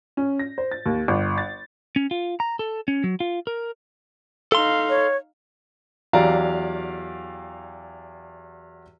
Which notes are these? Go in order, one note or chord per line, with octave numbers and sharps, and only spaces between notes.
C#4
A#6
C5
A6
D#2
G1
A6
C#4
F4
A#5
A4
C#4
F#3
F4
A#4
D#4 A4 F5 C6
C#5
E2 F#3 G4 D5 F5 A#5